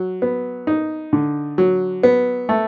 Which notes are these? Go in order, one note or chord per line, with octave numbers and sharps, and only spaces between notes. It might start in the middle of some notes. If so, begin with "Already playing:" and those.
Already playing: F#3
B3
D#4
D3
F#3
B3
A3